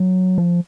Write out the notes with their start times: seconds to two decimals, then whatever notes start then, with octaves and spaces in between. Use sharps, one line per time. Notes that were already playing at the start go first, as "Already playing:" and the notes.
Already playing: F#3
0.38 F3